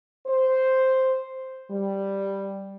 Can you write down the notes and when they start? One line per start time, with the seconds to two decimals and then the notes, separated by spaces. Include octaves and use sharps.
0.27 C5
1.71 G3